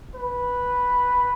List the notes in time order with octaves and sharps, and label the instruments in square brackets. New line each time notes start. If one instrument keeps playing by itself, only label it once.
[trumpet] B4